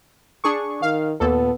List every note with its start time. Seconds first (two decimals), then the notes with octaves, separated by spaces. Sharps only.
0.44 D4 G#4 C#6
0.82 D#3 F5
1.20 D#2 A#2 B3 A4